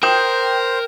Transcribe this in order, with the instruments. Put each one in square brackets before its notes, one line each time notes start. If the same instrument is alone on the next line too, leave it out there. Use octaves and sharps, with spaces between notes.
[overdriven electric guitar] A#4 [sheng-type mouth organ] C5 [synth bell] G5 [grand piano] D#6 G6 E7